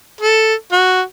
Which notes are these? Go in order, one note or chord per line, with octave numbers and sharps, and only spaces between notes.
A4
F#4